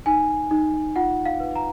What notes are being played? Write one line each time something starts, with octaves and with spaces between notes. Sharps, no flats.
D#4 G#5
D#4
F4 F#5
F5
B4
A#5